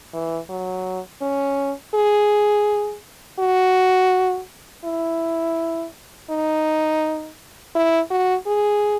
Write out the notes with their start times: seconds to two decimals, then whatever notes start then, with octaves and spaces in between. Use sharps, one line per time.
0.13 E3
0.49 F#3
1.21 C#4
1.94 G#4
3.39 F#4
4.84 E4
6.30 D#4
7.75 E4
8.10 F#4
8.47 G#4